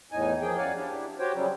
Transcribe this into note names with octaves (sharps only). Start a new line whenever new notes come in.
E2 A2 D#4 G#5
F3 A#3 G#4 G5
F#2 C#5 D5 F5 F#5 G#5
D4 E4 G4
F#4 G4 C5 C#5 G5
C#3 F#3 G3